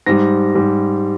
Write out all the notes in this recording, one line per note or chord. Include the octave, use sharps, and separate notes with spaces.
G#2 G3 A#6
G#2 G3